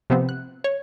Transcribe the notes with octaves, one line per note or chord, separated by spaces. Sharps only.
C3 F3 B3 C4
F#6
C#5